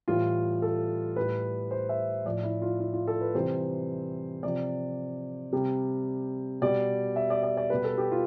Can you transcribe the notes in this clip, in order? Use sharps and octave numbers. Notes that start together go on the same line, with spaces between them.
A2 E3 G3 F4
A4
A2 G3 B4
C5
E5
A2 F3 D5
E4
F4
F4
F4
A4
B4
C3 E3 G3 C5
C3 F3 D5
C3 G3
B2 G3 D5
E5
D5
D5
D5
B2 G3 B4
A4
G4
F4